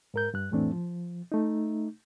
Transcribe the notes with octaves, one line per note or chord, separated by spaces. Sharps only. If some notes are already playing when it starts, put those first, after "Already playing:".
G#2 A#4 G6
G2 F#6
F2 A2 E3 A3 C4 D4
F3
A3 D#4